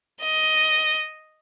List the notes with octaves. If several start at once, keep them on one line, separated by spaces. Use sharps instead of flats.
D#5